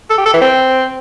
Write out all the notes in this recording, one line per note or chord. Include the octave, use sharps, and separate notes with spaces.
A4
G4
A4
E3
C4